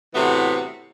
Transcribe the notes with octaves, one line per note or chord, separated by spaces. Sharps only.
A2 C3 E3 A3 B3 F#4